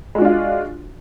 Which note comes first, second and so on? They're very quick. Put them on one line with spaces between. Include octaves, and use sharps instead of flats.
G#3 F#4 D4 F4